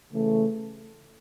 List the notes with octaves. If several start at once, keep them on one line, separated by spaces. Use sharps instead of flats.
C#3 E3 A3